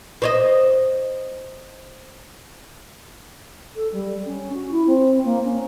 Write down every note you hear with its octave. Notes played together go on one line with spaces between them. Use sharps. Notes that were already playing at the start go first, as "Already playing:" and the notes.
C5 C#5 D#5
A4
G3
C#4
F#4
E4
C4
A#3
C#4